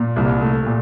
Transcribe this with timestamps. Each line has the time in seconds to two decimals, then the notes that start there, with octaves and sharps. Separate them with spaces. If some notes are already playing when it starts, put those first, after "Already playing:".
Already playing: A#2
0.16 C2
0.41 A3
0.66 A#2